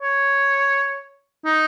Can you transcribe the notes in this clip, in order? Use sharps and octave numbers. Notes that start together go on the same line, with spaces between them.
C#5
D#4